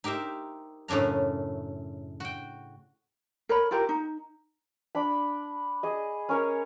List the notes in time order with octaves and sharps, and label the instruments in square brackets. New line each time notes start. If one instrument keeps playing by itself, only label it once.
[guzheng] D#4 G4 A#4 C5 E5
F#2 A2 C#3 D4 A#5
F#4 G5
[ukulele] A#4 C#5 B5
E4 F4 G4 A#4
D#4
[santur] D4 B5
G#4 D#5
C#4 A#4 C#5